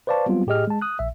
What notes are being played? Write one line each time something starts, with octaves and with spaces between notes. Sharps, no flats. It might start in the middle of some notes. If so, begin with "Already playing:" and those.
B4 C5 D5 F5 A5 C#6
F#3 G3 B3 C4 F4
A2 G4 G#4 D#5 F6
G#3 A5
D#6 F#6
A#1 E5